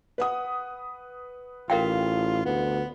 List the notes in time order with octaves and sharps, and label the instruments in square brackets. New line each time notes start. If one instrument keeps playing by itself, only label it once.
[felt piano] B4 F#5 D#6
[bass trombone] A1 [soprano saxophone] F4 [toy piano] A#4 F5 G5
[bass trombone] D2 [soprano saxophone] B3